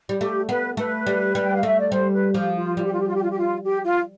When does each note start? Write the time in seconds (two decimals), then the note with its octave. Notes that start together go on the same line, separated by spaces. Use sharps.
0.09 G3
0.20 A3 G4
0.49 B3 B4
0.77 A3 B4
1.07 G3
1.35 G3
1.42 G5
1.55 F5
1.63 A3 E5
1.79 D5
1.92 G3 C5
2.13 B4
2.34 F3 G4
2.57 F4
2.77 G3 F4
2.85 G4
2.93 F4
3.01 G4
3.08 F4
3.15 G4
3.23 F4
3.30 G4
3.38 F4
3.63 G4
3.84 F4